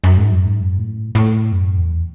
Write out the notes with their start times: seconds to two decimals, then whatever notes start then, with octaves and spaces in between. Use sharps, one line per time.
0.04 F#2
0.17 G#2
0.32 F#2
0.46 G#2
0.60 F#2
0.78 A2
1.15 A2
1.52 F#2
1.77 E2